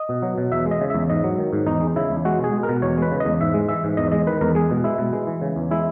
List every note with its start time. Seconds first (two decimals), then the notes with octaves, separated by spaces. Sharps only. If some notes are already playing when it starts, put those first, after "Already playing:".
Already playing: D#5
0.09 B2
0.22 F#3
0.38 B2
0.52 E2 E5
0.66 G#3
0.71 D#5
0.81 C#3
0.90 E2 E5
1.10 G#2 D#5
1.24 F#3
1.39 D#3
1.53 G#2
1.67 E2 D#4
1.81 G#3
1.96 C#3 E4
2.10 E2
2.25 G#3 F#4
2.39 B2
2.44 G#4
2.53 G#3
2.63 A#4
2.69 B2
2.82 E2 C#5
2.98 G#3 B4
3.11 C#3
3.20 E2 D#5
3.41 G#2 E5
3.54 G#3
3.68 E3 E5
3.84 G#2
3.97 E2 D#5
4.12 G#3 D#5
4.27 D#3 B4
4.41 E2 A#4
4.55 G#3 G#4
4.71 B2
4.84 G#3 E4
4.98 B2
5.13 G#3
5.27 E3
5.42 C#3
5.56 E2
5.71 G#3 E4